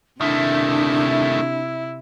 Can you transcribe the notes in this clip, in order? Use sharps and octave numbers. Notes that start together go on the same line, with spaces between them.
C3 D#3 A3 D4 E4